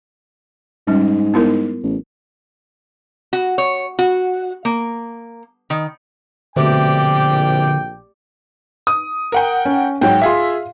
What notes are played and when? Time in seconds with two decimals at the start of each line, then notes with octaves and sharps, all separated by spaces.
0.87 G#2 G3 C#4
1.34 B3 E4 A#4
1.83 A1
3.33 F#4
3.58 C#5
3.99 F#4
4.65 A#3
5.70 D#3
6.56 A#1 B2 D3 A3 C4 G4 D5 G5
8.87 D#6
9.32 A#4 F#5 G5
9.65 C#4
10.01 G#2 F#3 G5
10.22 F4 G#4 E5 F5 C6